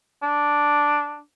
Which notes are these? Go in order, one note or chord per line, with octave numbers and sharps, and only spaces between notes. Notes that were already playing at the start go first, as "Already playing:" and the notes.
D4